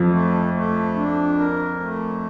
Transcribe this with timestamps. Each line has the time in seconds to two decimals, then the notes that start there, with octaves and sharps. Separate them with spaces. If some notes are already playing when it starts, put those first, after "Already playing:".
Already playing: F2 F3
0.11 A3
0.53 A3
0.95 D4
1.38 A#4
1.80 A3